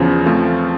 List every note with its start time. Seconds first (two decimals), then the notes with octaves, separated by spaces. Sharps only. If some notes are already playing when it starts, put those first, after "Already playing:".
Already playing: E2 C#3 F3
0.26 F3 A3 C4 F4